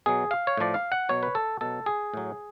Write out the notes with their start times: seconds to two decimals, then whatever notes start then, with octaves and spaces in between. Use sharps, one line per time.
0.06 B2 F#3 G#4
0.31 F5
0.47 C#5
0.57 A2 F3 D5
0.74 F5
0.92 F#5
1.09 B2 F#3 C#5
1.23 B4
1.35 A4
1.61 B2 F#3 A4
1.86 G#4
2.14 A2 F#3